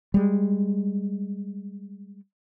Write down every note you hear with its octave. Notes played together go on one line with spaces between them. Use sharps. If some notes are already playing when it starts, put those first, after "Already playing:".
G3 G#3